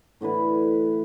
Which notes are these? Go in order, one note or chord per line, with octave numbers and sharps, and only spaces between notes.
A2 D3 E3 B4